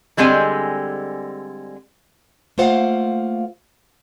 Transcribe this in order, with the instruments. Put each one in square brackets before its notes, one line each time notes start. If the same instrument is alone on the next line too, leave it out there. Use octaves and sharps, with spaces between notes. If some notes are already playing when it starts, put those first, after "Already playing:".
[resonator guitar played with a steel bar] D3 G3 G#3 C4 G#5
[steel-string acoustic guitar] A3 A#3 F4 C5 F5 F#5